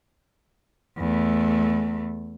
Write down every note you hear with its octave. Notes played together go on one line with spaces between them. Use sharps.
E2 A3